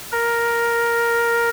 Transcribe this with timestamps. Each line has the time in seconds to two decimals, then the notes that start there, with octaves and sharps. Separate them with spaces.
0.12 A#4